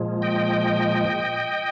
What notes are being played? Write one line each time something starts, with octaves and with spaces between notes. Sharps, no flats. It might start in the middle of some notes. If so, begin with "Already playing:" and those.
Already playing: A#2 F3 G#3
D#5 G5